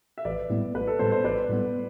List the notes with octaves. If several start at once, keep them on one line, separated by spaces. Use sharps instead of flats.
E5
A1 B4 D5
A2 G3 B3
A1 B4
A4
A2 G3 B3 A4 C5
A4 C5
A1 B4 D5
A2 G3 B3